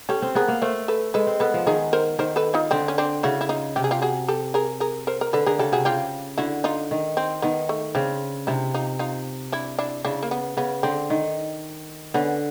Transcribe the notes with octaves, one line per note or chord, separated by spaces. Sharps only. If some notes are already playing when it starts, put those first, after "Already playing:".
C#4 G4 A4
C4
B3 G#4 A#4
A#3
A3 A#4 C5
A4 B4
G#3 A4 B4
C4
B3 A4 B4
F3
D#3 G#4 A#4
A#4 C5
D#3 A#4 C5
A4 B4
D#4 F4
D3 C4 D4
C#4
C4 D4
C#3 E4 F#4
E4
D#4 F4
C3 G4
G#4
F4 G4
F#4 G#4
G4 A4
G#4 A#4
G#4 A#4
A#4 C5
A#4
D3 A4 B4
D3 G#4 A#4
C#3 G4 A4
C3 F#4 G#4
C#3 F4 G4
D3 E4 F#4
D#4 F4
D#3
C4
D#3 B3
A3
C#3 C4 D4
C3 D4 E4
D#4 F4
D#4 F4
D4 E4
D4 E4
C#3 D4 E4
A#3
B3
C#3 B3
D3 C4
D#3
D3 B3 C#4